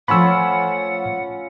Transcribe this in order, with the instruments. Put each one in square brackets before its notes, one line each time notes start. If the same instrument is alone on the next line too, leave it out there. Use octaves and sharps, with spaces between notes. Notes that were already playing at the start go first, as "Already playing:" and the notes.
[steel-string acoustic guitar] F3 A3 C5 [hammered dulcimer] C#4 F4 [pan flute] F#5 [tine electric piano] B5 E6